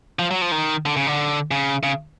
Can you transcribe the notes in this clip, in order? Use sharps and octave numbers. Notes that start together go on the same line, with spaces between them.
F3
F#3
F3
D#3
D3
C#3
D3
C#3
C#3